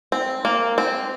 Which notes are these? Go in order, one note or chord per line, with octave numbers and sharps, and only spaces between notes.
C4
A#3
C4